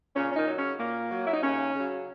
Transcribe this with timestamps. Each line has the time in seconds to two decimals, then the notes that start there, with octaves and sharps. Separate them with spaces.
0.16 A#2 C#3 C#4
0.32 C#4
0.36 D#3 D#4
0.47 F#3
0.58 C#3 C#4
0.79 A#2 A#3
1.11 F#3
1.26 E4
1.34 D#4
1.42 D#2 C#3 C#4
1.75 C#3 F#3